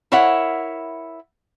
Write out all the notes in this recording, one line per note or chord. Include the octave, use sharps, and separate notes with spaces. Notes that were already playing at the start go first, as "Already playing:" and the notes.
E4 A#4 C#5 E5 F#5